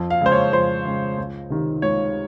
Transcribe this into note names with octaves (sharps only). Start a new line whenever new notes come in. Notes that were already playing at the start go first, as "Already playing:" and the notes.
Already playing: F2
F5
C#3 G#3 C5
C#5
F2 C5
C#3 G#3
C#2
C3 D#3
C#2 C#5